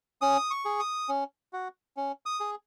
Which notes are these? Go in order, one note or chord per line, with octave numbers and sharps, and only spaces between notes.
C#4 D#6
C#6
G#4
D#6
C#4
F#4
C#4
D#6
G#4